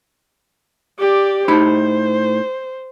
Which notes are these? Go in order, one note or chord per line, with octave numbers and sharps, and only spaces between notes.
G4 D5
A2 D#4 C5 B5